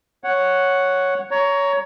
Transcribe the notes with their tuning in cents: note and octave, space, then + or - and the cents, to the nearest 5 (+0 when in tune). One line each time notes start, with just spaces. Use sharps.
C#5 +0 F#5 +0
C#5 +20 A#5 +0